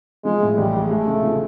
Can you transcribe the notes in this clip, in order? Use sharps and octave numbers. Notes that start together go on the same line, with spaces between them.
F3 G#3
A2
A1 G3
G#3
G#3 A3
C#3
F3